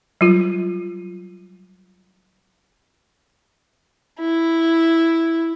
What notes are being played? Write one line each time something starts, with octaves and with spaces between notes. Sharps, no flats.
F#3 G3 F4
E4